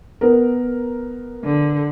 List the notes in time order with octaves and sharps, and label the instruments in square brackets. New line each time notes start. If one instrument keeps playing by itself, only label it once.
[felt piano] B3 A#4
[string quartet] D3